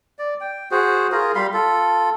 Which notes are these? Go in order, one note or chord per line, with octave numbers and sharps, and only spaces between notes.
D5
G5
F#4 G#4 C5
F4 G#4 A#4
G3 F5 B5 C6
F4 A4